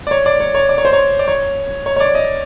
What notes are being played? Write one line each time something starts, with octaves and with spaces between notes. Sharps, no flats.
D5
C#5
D5
C#5
C#5
D5
C#5
C5
C#5
D5
C#5
C#5
C#5
D5
D#5